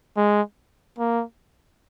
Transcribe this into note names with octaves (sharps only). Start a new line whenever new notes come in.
G#3
A#3